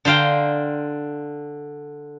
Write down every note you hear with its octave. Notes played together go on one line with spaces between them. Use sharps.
D3 C5 F5 G5 A#5